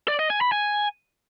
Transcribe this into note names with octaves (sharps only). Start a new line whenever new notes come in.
D5
D#5
G#5
B5
G#5